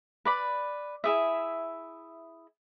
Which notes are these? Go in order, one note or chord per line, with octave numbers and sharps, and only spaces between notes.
B4 D5 B5
E4 G#4 E5